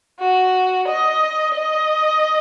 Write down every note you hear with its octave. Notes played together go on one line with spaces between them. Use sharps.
F#4
D#5
D#5